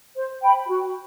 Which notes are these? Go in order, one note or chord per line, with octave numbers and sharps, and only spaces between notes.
C5
G5 B5
F#4